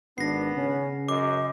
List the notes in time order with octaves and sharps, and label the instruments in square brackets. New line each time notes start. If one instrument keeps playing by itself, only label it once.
[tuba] G#1 [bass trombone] B3 [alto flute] D4 [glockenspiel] A#6 C7
[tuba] C#3 [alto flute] C#4
[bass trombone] F#2 [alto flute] D#5 [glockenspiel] D6